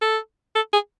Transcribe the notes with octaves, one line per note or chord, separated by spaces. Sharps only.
A4
A4
G#4